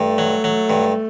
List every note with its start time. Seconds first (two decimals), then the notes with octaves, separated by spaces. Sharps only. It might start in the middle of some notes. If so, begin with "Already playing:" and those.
Already playing: G2 A3
0.18 F#3
0.44 F#3
0.70 G2